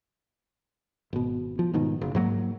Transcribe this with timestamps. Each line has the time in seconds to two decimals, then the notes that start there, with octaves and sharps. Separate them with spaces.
1.13 G#1 B2
1.59 F3
1.74 G#2 B2 D#3
2.01 F#1
2.15 G#2 F#3 A#3